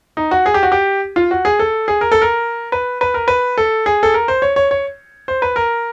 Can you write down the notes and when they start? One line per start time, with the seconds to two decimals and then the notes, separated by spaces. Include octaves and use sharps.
0.17 D#4
0.31 F#4
0.46 G#4
0.54 G4
0.63 F#4
0.72 G4
1.16 F4
1.31 F#4
1.45 G#4
1.59 A4
1.88 G#4
2.01 A#4
2.12 A4
2.22 A#4
2.72 B4
3.01 B4
3.14 A#4
3.28 B4
3.58 A4
3.86 G#4
4.03 A4
4.14 A#4
4.28 C5
4.42 C#5
4.56 C#5
4.71 C#5
5.28 C5
5.42 B4
5.56 A#4